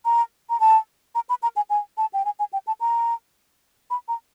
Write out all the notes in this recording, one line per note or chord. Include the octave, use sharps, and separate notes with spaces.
A#5
A#5
A5
A#5
B5
A#5
G#5
G#5
A5
G5
G#5
G#5
G5
A5
A#5
B5
A#5